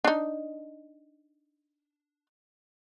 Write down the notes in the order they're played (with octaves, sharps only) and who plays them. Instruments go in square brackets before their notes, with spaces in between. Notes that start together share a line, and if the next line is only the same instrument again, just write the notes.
[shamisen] D4 D#4